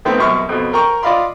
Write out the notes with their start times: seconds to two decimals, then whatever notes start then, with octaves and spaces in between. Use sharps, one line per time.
0.05 D#3 A3 B3 C4
0.18 C2 F#2 B2 C#6 F6
0.49 F2 B2
0.73 A#4 G5 A#5 C#6
1.03 F4 D5 D#5 F5 B5 C6